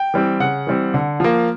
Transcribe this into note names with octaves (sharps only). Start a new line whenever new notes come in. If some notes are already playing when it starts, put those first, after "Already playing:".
Already playing: G5
E3 G3 C4
C#3 F#5
E3 G3 C4
D3
F3 A#3